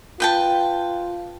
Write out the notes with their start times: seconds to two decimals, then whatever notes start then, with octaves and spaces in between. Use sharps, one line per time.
0.20 F4 B4 G5 A5